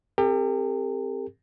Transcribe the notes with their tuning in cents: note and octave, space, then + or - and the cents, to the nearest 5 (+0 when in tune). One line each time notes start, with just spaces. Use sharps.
C4 +5 G4 +30 A#4 -45